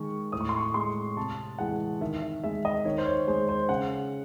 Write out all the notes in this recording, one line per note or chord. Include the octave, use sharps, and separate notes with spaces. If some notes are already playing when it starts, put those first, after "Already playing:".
Already playing: D#3 G#3 C#6
A2 D#6
C#6
C6
C#6
G#3 C6
C3 A5
E3 G#3 F#5
D#3 E5
E5
G#3 E5
D#5
D#3 C#5
C5
C#5
G#3 C5
C5
C#3 F#5